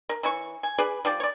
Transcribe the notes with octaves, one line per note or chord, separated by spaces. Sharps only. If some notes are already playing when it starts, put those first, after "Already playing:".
A#4
E3 C#4 C#6
G#5
G#4 B4 D5
F3 G4 D5
C#5 D5